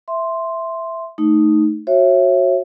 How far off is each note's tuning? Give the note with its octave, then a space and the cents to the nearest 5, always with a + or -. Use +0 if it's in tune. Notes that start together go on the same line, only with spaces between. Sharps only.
E5 +0 C6 +0
A3 +0 D#4 +0
F#4 +0 C#5 -35 E5 +15